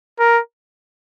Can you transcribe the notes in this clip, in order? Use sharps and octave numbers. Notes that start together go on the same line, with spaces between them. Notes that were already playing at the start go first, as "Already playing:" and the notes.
A#4